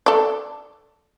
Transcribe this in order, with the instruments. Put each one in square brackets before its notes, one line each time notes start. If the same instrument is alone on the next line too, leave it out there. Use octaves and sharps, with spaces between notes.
[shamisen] A4 D5